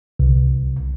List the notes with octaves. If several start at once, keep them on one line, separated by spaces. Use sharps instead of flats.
C2